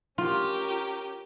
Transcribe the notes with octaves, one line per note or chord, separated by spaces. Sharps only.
C#4 F4 G4 A#4